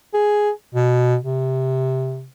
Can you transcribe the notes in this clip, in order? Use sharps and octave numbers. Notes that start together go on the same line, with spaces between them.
G#4
B2
C3